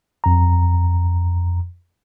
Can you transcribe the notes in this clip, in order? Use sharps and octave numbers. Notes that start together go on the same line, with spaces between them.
F2 A#5